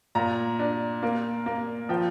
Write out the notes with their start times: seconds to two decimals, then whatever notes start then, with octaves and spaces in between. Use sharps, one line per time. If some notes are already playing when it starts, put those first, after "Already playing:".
0.15 A#2 A#5
0.59 D4
1.03 A#3
1.46 A#3
1.89 F3 G5